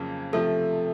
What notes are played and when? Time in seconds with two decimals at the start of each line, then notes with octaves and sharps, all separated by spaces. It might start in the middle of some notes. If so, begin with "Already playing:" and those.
Already playing: F2 C#3 F#3 A#3 C#4
0.33 C3 F3 A3 A4